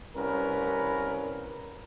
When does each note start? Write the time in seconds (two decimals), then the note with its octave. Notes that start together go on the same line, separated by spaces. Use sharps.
0.15 C2 C#4 A#4 B4